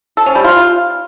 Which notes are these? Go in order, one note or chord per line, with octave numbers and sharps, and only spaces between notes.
A4
C#4
G3
F4